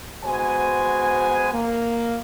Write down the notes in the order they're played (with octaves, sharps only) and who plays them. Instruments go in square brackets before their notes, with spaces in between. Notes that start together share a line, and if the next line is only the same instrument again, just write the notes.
[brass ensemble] G#3 B3 F#4 C5 G#5
A#3